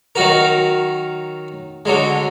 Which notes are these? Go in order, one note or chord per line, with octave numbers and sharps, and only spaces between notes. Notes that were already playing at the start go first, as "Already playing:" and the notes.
D#3 F#3 F#4 A#4
D3 F#3 G#3